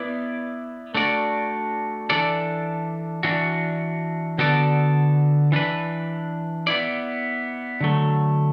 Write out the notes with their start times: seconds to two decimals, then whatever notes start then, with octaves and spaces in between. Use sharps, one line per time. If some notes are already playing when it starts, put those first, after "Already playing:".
Already playing: B3 E4 B4 D5
0.94 A3 D4 F#4 D5
2.10 E3 D4 A4 D5
3.23 E3 D4 F#4
4.38 D3 B3 F#4 A4 D5
5.52 E3 D4 B4
6.67 B3 E4 D5
7.81 D3 F#3 A3